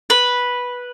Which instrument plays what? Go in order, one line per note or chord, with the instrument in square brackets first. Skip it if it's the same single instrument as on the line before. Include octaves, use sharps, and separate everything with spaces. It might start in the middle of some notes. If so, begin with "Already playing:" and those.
[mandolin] B4